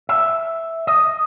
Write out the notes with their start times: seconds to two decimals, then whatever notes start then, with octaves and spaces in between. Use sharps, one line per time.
0.09 E5
0.87 D#5